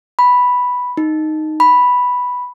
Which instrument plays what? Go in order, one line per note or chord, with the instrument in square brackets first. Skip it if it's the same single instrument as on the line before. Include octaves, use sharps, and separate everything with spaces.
[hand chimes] B5
D#4
B5